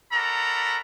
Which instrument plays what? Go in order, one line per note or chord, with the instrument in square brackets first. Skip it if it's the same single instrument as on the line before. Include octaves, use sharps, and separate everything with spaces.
[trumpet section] F#4 A4 A#4 D5 A#5 B5